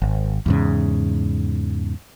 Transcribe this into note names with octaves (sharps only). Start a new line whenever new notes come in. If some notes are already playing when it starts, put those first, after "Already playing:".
G#1
E2 G#2 C#3